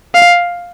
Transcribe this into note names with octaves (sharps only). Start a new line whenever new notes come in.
F5